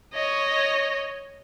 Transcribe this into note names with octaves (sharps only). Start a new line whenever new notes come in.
C#5 D#5